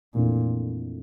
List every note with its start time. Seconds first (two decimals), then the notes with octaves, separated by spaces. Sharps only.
0.14 F2 A#2 E3 A3 D4